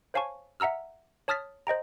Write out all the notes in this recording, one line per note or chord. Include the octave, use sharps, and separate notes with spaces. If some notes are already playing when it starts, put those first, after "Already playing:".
C5 C#5 F5 G#5 A5 C#6
E5 F#5 A#5 E6 F6
C#5 A5 D#6 F6 A6 B6
C5 D#5 G5 A#5